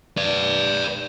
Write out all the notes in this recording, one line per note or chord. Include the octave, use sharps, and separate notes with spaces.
B4 D5